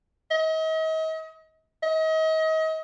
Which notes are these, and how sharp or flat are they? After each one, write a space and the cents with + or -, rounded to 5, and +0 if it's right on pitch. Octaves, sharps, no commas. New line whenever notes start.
D#5 +40
D#5 +35